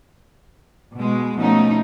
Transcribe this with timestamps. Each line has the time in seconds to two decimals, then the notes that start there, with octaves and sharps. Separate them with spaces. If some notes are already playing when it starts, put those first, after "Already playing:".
0.96 B2 G#3
1.37 B2 F3 A3 C#4 D#4